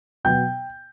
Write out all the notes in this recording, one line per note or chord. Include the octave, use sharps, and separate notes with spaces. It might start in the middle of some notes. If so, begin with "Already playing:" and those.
B2 F#3 B3 G5 G6